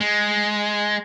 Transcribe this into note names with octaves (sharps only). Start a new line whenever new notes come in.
G#3